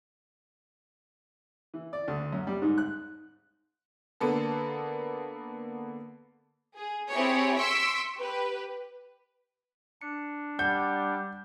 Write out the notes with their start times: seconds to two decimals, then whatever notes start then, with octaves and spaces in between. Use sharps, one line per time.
1.74 E3
1.93 D5
2.08 D2
2.33 F#2
2.47 G3
2.62 G#2
2.78 F#6
4.20 D3 A#3 B3 A4
6.76 G#4
7.10 C4 E4 G4 G#4 C#5
7.58 C6 C#6 E6 B6 D7
8.18 G4 B4
10.01 D4 C#7
10.59 G3 D5 F#5 G6